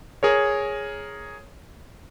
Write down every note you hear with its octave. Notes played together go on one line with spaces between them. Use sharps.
G#4 A#4 C#5